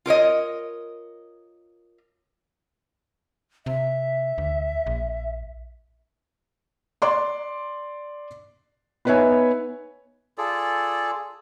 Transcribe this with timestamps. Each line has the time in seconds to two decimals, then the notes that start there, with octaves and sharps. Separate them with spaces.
0.06 F4 A#4 C#5 D#5
3.66 C3 E5
4.38 D2
4.86 A#1
7.02 D5 C6 D6
9.05 B3 D#4 B4 C#5 E5 G#5
10.38 F4 G#4 A4 D5